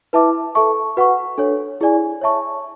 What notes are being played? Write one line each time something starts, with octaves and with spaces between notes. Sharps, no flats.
E4 B4 E5 A5 D6
A4 E5 A5 C#6
F#4 B4 F#5 C#6
D4 A4 C#5
E4 G#4 D5 G#5
C#5 E5 A5 C#6